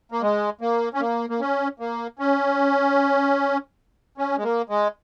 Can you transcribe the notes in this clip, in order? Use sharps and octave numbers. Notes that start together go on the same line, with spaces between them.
A#3
G#3
A#3
C#4
A#3
A#3
C#4
A#3
C#4
C#4
G#3
A#3
G#3